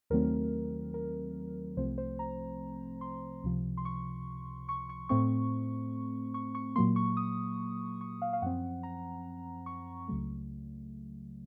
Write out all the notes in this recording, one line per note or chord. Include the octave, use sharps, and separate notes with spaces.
D#2 D#3 F#3 A3 C4 A#4
A#4
C2 C3 F3 A3 C4 C5
C5
A#5
C6
C#2 C3 F3
C6
C#6
C#6
C#6
A2 A3 C4 C#6
C#6
C#6
A#2 F#3 A#3 C6
C#6
D#6
C#6
F5
F5
F#2 F3 C4 F#5
A#5
C#6
C#2 C#3 F#3 A3